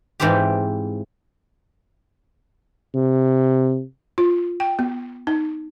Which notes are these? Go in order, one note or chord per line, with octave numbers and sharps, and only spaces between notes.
G#2 E3 C4 F4 G4
C3
F4
G5
B3
D#4